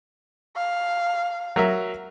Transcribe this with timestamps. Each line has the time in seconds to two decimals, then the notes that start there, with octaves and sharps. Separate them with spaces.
0.56 F5
1.56 F#3 A#4 E5